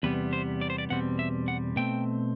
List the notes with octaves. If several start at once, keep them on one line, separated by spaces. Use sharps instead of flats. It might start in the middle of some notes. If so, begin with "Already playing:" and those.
E2 C3 G3 B3 B4
C5
D5
C5
D5
E2 B2 G3 C4 F#5
E5
F#5
B2 A3 C4 G5